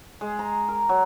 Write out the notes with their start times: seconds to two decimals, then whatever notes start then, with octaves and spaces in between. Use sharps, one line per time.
0.21 G#3
0.39 A#5
0.69 A#4
0.89 F#3